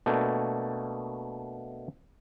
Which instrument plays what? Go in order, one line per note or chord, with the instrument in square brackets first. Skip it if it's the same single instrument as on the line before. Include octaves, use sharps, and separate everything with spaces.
[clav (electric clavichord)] B2 A3 A#3 D4